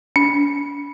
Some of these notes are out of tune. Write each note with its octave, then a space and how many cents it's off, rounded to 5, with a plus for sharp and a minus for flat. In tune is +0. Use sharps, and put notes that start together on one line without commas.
D4 -45